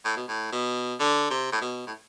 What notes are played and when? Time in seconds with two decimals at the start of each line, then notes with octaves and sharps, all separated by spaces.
0.05 A2
0.16 B2
0.28 A2
0.52 B2
1.00 D3
1.30 C3
1.52 A2
1.61 B2
1.87 A2